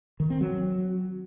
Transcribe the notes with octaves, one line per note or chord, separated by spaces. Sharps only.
D#3
C4
F#3